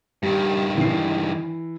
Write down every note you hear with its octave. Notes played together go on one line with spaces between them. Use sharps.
G2 D#3 G3
E3 C7